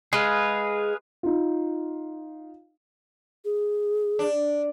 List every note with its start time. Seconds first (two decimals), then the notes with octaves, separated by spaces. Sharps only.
0.13 G#3 G#4 B4 F5
1.23 D#4 F4
3.45 G#4
4.19 D4